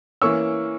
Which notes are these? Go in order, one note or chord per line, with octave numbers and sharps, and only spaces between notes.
E3 A#3 C#4 C#6 E6